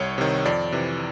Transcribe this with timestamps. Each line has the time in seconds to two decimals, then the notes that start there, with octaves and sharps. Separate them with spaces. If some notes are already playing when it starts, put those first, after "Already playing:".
Already playing: C2 C#5
0.18 C3 D#3
0.46 F2 D5
0.72 C3 E3